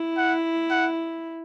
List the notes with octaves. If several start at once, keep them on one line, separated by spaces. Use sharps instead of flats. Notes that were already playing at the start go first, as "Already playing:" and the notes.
Already playing: E4
F#5
F#5